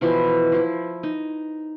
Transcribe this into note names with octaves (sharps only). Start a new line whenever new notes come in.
B2 E3 F3 E4
F3 E4
D#4